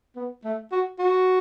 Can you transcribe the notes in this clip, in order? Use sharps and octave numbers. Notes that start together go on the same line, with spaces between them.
B3
A3
F#4
F#4